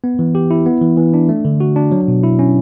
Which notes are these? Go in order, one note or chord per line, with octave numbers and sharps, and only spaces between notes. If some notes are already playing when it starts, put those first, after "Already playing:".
B3
E3
G4
E4
B3
E3
E3
D4
A3
D3
F#4
D4
F#3
B2
E4
C#4